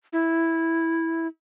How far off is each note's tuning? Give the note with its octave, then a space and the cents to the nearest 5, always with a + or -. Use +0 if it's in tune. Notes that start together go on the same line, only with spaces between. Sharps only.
E4 -5